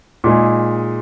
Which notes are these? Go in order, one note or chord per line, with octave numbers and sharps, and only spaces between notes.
A#2 G#3 D#4 G#4